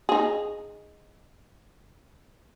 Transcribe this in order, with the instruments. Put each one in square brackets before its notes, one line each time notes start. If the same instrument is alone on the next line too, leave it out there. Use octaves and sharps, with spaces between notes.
[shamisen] D#4 G#4